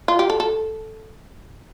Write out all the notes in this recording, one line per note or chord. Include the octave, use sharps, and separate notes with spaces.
F4
G4
A4
A4